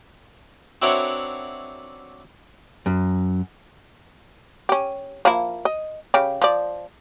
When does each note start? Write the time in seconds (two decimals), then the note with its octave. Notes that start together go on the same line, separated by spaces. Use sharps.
0.82 C4 D4 E4 F#4 A#4 C#5
2.86 F#2
4.69 C#4 G4
5.25 F3 A#3 E4
5.65 D#5
6.14 C#3 G4
6.42 F3 D5